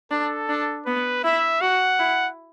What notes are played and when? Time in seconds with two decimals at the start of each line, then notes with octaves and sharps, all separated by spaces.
0.11 D4 A4
0.49 D4
0.86 B3 B4
1.24 E4 E5
1.61 F#4 F#5
1.99 E4